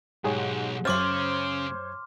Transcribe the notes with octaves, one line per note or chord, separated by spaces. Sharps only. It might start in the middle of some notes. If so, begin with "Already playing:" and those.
B1 G#2 G4 G#4 C#5
F#2 C#3 C5 C#5 C6 D6 F6 A6